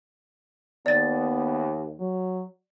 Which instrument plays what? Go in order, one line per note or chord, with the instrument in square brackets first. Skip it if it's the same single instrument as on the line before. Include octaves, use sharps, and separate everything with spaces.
[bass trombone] D#2 [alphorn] B3 [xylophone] D5 A6
[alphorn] F#3